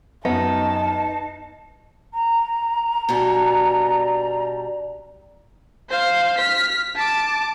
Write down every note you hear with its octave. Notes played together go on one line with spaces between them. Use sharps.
F#2 B3 D#4 A5
A#5
B2 G3 D4
C5 F5
F6 B6
A5 D6